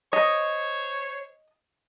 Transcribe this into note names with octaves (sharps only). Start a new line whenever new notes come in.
C5 C#5 D#5